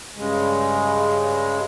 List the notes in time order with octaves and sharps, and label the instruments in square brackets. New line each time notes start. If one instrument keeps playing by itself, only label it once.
[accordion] G2 C#3 G#3